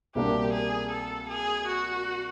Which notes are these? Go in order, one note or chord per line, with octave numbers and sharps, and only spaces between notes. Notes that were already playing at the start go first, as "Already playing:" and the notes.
C2 B2 G3 A#3 D4 G4
G#4
A4
G#4
F#4